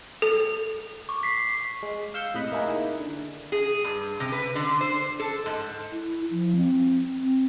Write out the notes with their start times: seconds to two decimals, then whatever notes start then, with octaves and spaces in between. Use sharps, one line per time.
0.22 A4
1.09 C#6 D6
1.23 B6 C7
1.83 G#3
2.14 F5 E6 G6 C#7
2.34 A2 C3 D#5 B5 F#6
2.52 A#3 D#4 E4 G#4 A#4
3.00 D3
3.52 G#4
3.84 G2
4.20 C3
4.32 B4
4.55 D3
4.81 C5
5.20 A4
5.46 G#2
5.92 E4
6.31 F3
6.56 C4
7.21 C4